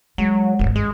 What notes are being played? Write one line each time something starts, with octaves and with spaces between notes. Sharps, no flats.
F#3 G#3
D1 G#1 D2
G2 G#3